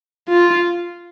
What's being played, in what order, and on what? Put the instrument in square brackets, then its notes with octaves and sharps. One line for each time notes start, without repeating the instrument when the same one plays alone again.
[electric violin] F4